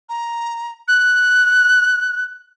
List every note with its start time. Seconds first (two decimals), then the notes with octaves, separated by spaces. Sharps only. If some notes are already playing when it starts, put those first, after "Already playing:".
0.09 A#5
0.88 F#6